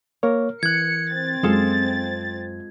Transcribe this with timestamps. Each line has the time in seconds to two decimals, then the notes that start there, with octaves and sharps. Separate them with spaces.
0.23 A#3 A#4 C#5
0.63 E3 F#6 G#6 C#7
1.12 C4 A6
1.43 F#2 G#3 F4 A4